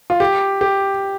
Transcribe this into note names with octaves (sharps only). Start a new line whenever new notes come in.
F4
G4
G4